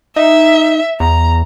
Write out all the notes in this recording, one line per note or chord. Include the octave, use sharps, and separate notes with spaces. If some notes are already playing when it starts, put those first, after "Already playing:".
D#4 E5
E2 A#5